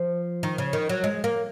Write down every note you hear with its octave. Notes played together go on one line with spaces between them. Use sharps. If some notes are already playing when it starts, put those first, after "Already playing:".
Already playing: F3
D#3
C#3
D#3
F#3
G#3
A#3